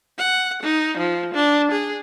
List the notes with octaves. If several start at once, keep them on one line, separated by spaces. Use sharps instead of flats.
F#5
D#4
F3
D4
G#4